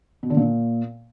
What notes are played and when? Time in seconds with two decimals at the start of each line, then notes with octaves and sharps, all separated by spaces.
0.23 B2
0.30 D3
0.37 A#2